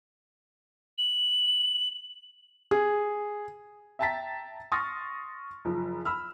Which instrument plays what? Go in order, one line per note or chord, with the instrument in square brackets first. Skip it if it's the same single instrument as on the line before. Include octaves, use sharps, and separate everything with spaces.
[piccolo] F#7
[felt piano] G#4
[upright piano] E5 G5 A5 A#5 A6 B6
C6 C#6 D#6 F6 A6 A#6
F#1 F3
B5 E6 F6